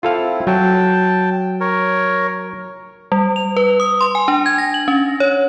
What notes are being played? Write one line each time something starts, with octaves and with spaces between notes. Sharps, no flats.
C4 E4 F4 A4 F5
F#3 G5 A5
A#4 C#5
G3
F7
B4
D#6
C6
G#5
D4
G#6
A#6
F#7
C#4
C#5